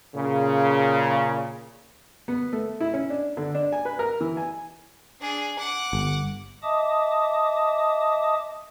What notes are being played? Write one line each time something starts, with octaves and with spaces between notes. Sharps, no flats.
A#2 C#3
B3
A3
E4
C#4
D4
D3
D4
G#5
B4
A#4
E3
G#5
D4 G#4
F#5 D6
G1
D#5 E5 A5 D6 D#6